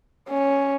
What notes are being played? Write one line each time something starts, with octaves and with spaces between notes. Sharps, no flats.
C#4